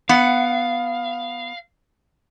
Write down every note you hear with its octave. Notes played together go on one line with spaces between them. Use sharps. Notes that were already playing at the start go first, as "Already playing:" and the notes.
B3 F5 F#5